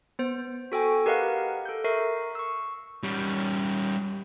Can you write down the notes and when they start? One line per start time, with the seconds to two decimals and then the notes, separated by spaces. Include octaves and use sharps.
0.19 B3 C5
0.72 F#4 A4 G5 G#5 C#6
1.06 G4 A#4 B4 D#5 F5 F#5
1.65 A4 G6
1.84 A#4 E5 C#6 A#6 C7
2.35 C#6 E6
3.03 G3 C#4